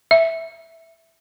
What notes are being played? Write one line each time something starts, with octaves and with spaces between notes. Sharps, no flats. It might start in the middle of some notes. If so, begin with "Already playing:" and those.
E5